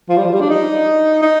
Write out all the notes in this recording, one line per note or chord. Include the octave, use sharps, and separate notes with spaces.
F3
G3
F3
G3
D4
D#4
D#4